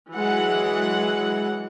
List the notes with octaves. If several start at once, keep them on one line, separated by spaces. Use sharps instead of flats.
E3 F#3 G#3 F#5